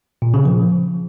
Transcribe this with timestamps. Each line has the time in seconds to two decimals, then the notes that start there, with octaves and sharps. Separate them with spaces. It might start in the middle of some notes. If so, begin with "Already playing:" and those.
0.22 A#2
0.34 C#3
0.45 F3